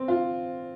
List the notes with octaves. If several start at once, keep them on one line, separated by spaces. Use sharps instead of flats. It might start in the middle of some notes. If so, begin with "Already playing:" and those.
Already playing: C4
F4